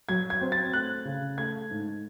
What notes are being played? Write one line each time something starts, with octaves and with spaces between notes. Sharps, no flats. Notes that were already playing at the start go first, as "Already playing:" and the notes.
F#3 G#6
G#6
C4
A6
A3 F#6
C#3
A3 G#6
G#2